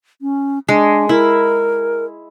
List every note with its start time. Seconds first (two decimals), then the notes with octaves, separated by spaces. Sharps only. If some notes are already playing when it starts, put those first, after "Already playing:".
0.22 C#4
0.68 G#3 D4
1.09 E4 A#4